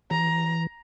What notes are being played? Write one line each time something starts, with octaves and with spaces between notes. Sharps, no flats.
E3 A#5